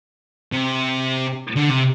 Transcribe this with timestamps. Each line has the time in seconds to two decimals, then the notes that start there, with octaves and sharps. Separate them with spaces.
0.52 C3
1.56 D3
1.70 C3